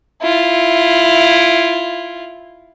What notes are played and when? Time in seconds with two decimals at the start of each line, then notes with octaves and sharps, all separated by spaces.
0.22 E4 F4